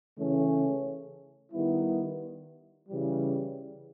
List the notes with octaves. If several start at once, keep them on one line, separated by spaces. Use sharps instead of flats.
C#3 E3 A3 C#4
D#3 G3 B3 E4
C#3 E3 G3